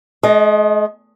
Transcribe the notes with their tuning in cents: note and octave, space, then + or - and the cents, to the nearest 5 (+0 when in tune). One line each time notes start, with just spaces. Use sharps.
G#3 +45 D#5 +0